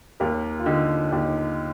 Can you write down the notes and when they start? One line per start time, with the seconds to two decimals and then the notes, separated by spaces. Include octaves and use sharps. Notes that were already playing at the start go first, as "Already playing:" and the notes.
0.20 D#2 G4 A#4
0.60 F4
0.66 D3 D#4 G4
1.12 D#2 D#4 G4